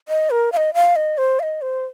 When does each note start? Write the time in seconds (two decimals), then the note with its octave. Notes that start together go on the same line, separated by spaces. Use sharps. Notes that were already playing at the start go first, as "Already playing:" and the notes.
0.08 D#5
0.30 A#4
0.52 F5
0.57 D#5
0.74 F5
0.96 D#5
1.18 C5
1.40 F5
1.43 D#5
1.62 C5